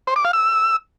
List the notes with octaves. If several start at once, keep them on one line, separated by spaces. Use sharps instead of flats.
C5
D6
F5
E6